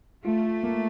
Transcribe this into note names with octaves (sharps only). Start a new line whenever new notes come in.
A3 F4
F4
A#3